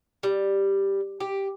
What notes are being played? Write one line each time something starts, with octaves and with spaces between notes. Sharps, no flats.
G3
G4